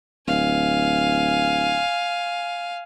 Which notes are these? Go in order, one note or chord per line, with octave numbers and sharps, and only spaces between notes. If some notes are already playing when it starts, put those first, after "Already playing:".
D1 F5 G#5